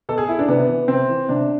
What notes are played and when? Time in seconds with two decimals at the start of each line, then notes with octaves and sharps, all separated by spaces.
0.09 B2 A4
0.18 G#4
0.29 E4
0.39 D4
0.48 C3 B3
0.68 E3
0.88 C3 C4
1.09 E3
1.29 C3 D4